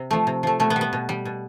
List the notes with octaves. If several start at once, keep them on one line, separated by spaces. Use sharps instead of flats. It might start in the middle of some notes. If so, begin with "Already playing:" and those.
Already playing: C3
F3 A3
C3
F3 A3
B2 A3
B3
G3
B3
B2
G3
B2